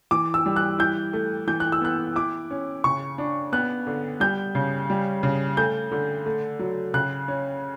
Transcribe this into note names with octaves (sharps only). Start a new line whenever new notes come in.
E3 D6
E6
G3
F#6
E4 G6
A3
E3 G6
F#6
E6
B3 F#6
E4 D6
C#4
C#3 C#6
D4
B3 F#6
D3
G3 G6
C#3
G3
C#3
A3 G6
D3
A3
F#3
C#3 F#6
C#4